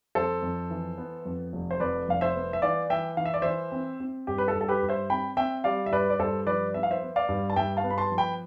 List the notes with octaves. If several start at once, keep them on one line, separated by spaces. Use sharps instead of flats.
F2 A4 C5
F2
E3
B3
F2
F1
C5
F2 B4 D5
F1 F5
C5 E5
B3
E5
E3 D5 F5
E3 E5 G5
E3 F5
E5
D5
E3 C5 E5
C4
C4
G2 G4
B4
A4
G2
A4
G4 B4
G2
C5 E5
C4 G5 B5
C4 E5 G5
G3 D5 F5
E5
G2 B4 D5
D5
G2 A4 C5
F3 B4 D5
B3 E5
F5
C5 E5
B3
D5 F5
G2
A5
G2 E5 G5
F5 A5
B3
B5
A5 C6
F3
G5 B5